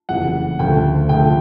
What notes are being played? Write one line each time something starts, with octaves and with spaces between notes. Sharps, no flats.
F#1 F2 C#3 E3 G3 F#5
D2 C#3 F3 A3 G5
D2 C#3 F3 A3 G5